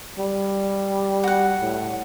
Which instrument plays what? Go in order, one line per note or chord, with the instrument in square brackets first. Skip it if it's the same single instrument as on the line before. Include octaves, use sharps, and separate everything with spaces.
[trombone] G3
[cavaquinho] F#4 F#5
[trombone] A2